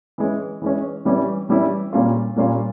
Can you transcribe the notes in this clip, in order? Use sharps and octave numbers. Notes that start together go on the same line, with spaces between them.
E3 G#3 C#4
E3 G#3 C#4
E3 G3 C#4 E4
E3 G3 C#4 E4
A#2 G3 A#3 C#4 F4
A#2 G3 A#3 C#4 F4